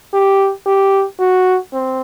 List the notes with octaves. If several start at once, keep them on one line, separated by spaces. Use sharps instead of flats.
G4
G4
F#4
C4